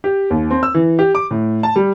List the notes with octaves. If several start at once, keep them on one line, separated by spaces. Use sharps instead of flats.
G4
D#2
C4
E6
E3
G4
D6
A2
A5
G3